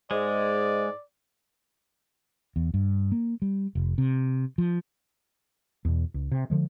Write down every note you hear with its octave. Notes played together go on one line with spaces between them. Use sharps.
G#2 G#3 D5
E2
G2
A#3
G3
F1
C3
F3
E2 B2
C#2
C3
D3 F3 G#3